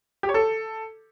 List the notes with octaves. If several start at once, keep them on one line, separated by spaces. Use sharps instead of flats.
G4
C#5
A4